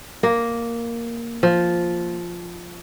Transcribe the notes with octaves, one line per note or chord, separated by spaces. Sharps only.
A#3
F3